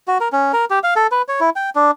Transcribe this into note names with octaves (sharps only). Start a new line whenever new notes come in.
F#4
A#4
C#4
A#4
G4
F5
A4
B4
C#5
E4
G5
D4